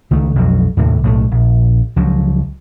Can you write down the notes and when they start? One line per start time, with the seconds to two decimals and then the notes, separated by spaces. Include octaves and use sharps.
0.11 C#2 D#3 A3
0.35 B1 F2 F#3
0.77 D#2 A2 C3
1.03 B1 A2 E3 A3
1.31 A#1
1.96 C#2 F3 F#3